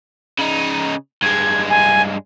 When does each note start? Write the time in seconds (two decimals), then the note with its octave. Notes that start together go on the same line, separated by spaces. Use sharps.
0.39 C#3 D#4
1.22 G2 G#3 G#6
1.70 G#5